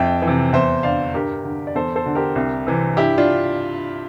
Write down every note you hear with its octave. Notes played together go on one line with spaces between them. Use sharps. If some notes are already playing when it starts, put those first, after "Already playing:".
Already playing: F2 E5 G5
E3
C3
E2 C5 E5
D3 D5 F5
G2 G4 A#4
D3
D5
E2 A4 C5
A4 C5
D3
G4 A#4
C2
C3 E3
G2 E4 G4
D4 F4